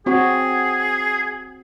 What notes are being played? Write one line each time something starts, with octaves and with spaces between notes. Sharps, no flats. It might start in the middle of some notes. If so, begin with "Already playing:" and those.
C4 F#4 G#4